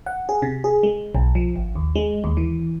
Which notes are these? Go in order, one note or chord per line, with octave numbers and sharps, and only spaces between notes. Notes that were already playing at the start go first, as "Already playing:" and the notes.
F#5
G#4
C3
G#4
G#3
B1
F3
G#1
D#2
G#3
D#2
E3